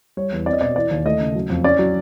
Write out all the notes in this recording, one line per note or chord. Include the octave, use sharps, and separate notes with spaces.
G3 C#5
E2
C4 D5
D#5
B2 D5
E3 D5
D#2
A3 D#5
C#3
F#3
F2
C#4 D5
F#3